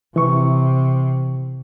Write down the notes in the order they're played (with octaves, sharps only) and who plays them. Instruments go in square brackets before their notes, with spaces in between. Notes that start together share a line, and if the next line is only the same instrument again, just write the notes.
[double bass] C3 [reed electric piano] E3 C#6